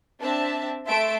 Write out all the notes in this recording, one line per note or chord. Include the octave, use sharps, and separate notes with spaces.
C4 D4 E5 A5
A3 E5 A5 C6 D7